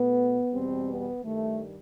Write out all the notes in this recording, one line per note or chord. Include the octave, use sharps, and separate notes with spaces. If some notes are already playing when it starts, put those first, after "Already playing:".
Already playing: B2 A3 B3
E2 B2 G3 C4
B3
G2 D#3 G3 A3